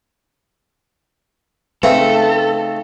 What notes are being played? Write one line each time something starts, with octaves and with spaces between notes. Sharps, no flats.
C#3 A3 C4 D#4 A4 B4 E5